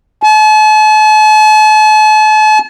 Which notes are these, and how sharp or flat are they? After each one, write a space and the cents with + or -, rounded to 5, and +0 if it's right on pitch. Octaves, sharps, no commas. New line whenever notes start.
A5 -45